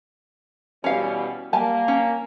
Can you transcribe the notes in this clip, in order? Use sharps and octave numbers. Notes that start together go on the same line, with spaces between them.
B2 E3 G3 C#4 F5
G3 A#3 G#5 A5
C#4